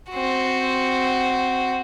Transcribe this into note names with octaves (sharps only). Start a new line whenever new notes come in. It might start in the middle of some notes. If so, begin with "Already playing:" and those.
C4 F#4